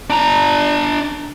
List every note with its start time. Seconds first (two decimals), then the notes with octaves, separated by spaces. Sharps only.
0.10 D4 A#5